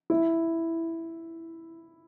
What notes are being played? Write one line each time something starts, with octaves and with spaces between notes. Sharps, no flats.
E4